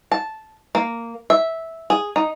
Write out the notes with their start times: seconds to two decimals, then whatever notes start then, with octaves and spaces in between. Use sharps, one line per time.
0.12 A5
0.75 A#3
1.30 E5
1.90 G#4
2.16 D#4